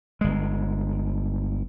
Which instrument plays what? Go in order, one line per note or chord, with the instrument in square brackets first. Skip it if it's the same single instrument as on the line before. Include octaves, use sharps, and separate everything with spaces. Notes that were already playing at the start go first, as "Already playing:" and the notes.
[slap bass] G1 G#3